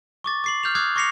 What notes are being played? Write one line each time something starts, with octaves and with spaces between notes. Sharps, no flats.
C#6 D6 A6
D6 C7 F#7
F6 G6 C7 F7
D6 D#6 F6 F#6 G#6 C7
C#6 D6 A#6 C7 C#7 F7